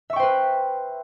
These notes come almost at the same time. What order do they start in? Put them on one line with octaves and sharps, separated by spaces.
E5 C#6 G5 C5 B4